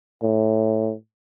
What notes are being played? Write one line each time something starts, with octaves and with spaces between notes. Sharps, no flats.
A2